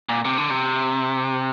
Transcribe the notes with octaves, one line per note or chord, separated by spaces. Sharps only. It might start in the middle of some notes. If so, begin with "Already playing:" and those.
A#2
C3
D3
C3